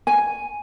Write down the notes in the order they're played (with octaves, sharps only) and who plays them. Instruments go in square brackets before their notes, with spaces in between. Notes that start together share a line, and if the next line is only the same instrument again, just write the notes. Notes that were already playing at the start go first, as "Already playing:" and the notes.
[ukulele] G#5